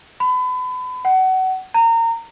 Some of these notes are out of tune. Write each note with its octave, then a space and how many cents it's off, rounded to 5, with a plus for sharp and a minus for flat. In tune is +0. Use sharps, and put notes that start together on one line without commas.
B5 +35
F#5 +25
A#5 -25